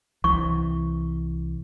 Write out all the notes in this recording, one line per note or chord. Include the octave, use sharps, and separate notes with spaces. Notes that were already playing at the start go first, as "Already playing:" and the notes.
C2 E3 C#6